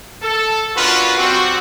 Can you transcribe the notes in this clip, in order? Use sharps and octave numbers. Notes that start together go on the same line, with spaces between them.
A4
A#3 C#4 D4 F4 F#4 B4
G3 C4 F#4